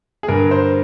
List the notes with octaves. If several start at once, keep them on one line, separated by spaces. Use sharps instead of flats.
G#4
G2 D3 A#4
C5